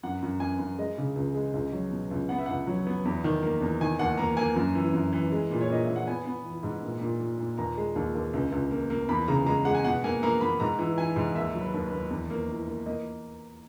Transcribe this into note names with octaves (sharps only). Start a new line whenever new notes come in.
F#2 F#5
F#2
F#2 G#5
F#2
G#3 D#5
C#3
C#2
G#3
C#2
F#3
B2
C#2
B3 F#5
E5
C#2 F#5
F#3
B3
E2
D#3
A#3
E2
D#3 G#5
D#2 F#5
A#3 A#5
A#3 G#5
F#2
E3
F#2
E3
G#3
A#2
C#5
A#2 D#5
A#2 E5
F#5
B3 G#5
B3
E3
G#2
A#2
A#2
A#3
A#2
D#2 A#5
G#3
D#2
D#2
C#2
C#2
A#3
A#3
E2 B5
C#3 A#5
G#3 A#5
G#3 F#5
G#5
B2 F#5
A#3 G#5
A#3 A#5
A#3 B5
G#2 A#5
E3
E3 G#5
G#2
D#2 E5
F#3
B4
D#2
B4
D#2
E2
A#3
E3
A#3
A#3 D#5